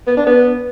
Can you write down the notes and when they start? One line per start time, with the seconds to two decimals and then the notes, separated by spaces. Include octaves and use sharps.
0.07 B3
0.17 D4
0.27 B3